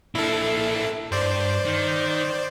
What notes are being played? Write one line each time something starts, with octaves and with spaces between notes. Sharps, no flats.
A#3 D4 E4 A4
G2 C5 D5
D#3